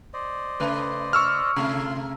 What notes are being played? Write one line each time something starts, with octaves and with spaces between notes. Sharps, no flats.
C5 D5 D#5
C#3 A3 B4
C#6 E6 F6
C3 A3 F4 C6